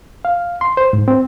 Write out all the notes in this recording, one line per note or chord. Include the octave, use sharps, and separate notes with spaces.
F5
C6
C5
G#2
C4